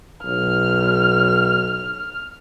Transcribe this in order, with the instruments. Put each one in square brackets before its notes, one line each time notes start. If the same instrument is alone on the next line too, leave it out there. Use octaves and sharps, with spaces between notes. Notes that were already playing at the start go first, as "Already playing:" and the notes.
[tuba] B1 [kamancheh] F6